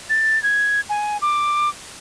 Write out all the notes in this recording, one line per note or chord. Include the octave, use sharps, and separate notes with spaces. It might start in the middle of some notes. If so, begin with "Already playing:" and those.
A6
G#6
G#5
D6